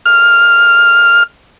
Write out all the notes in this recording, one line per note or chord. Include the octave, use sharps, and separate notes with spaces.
F6